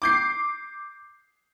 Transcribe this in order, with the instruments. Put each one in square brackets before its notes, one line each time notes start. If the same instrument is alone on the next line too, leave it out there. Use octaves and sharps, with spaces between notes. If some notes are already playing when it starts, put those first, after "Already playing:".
[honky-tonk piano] D6 G6 C7